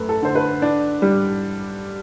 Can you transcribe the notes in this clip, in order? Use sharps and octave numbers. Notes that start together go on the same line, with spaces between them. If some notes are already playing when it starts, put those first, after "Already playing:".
Already playing: F#2 A3 B4
A4
D3 C5
B4
D4
G3